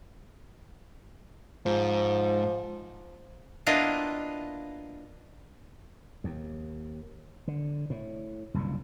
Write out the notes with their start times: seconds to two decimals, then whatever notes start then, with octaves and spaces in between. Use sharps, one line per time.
1.66 G#2 F3
3.66 A#3 B3 D4 E4 F4 D#5
6.24 D#2
7.48 D3
7.90 A2
8.54 F#1 C2 G2 A#2